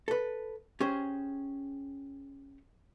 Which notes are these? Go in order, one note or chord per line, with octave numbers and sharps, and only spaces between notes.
A4 B4
C#4 G4 G#4 C5